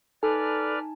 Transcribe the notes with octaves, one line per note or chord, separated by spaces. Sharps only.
D#4 A4 B4 D5 G#5 A5 F6